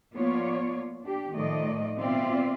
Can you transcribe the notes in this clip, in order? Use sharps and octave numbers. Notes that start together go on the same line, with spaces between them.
F3 A#3 B3 F4 C#5 D5
D4 G4
A2 D#3 F3 A3 D5 D#5
B2 B3 C4 F4 D5 E5